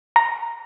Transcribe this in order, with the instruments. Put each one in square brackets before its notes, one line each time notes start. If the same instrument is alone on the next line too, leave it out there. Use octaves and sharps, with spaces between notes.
[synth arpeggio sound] A#5